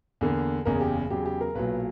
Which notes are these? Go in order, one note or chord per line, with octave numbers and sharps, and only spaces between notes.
E2 D3 A#3
F#1 E2 C#3 A#4
G4
E2 C#3 F#3 G4
G4
A#4
B1 A#2 F#3 B4